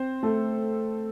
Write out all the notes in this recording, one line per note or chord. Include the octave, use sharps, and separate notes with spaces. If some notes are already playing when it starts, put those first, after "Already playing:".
Already playing: C4 C5
A3 A4